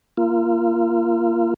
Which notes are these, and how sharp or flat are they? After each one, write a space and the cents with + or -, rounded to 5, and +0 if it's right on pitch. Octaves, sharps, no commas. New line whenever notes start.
A#3 +0 F4 -30